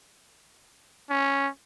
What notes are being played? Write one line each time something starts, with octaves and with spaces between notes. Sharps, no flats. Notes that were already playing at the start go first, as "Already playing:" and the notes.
C#4